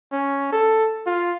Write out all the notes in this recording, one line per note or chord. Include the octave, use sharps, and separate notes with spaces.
C#4
A4
F4